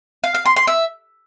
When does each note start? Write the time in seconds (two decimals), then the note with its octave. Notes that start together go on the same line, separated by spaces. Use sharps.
0.24 F5
0.35 F5
0.45 C6
0.56 C6
0.67 E5